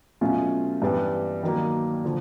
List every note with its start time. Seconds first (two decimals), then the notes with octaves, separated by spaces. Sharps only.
0.21 B2 F#3 A3 C#4 F4
0.82 G2 E3 G3 B3
1.43 D#3 F#3 A#3
2.04 D3 F3